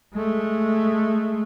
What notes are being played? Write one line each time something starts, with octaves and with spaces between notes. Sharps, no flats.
G#3 A3